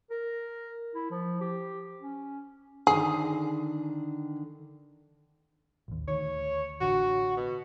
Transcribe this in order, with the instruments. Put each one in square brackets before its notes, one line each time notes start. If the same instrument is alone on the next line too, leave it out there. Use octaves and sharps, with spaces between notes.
[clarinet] A#4
E4
F3
G4
C#4
[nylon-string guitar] D3 D#3 [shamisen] G#4
[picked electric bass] A1 D#2
[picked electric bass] D2 D#3 [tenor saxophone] C#5
[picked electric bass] A1 D3 [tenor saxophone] F#4
[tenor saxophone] B2